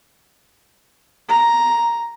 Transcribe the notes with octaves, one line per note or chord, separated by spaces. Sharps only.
A#5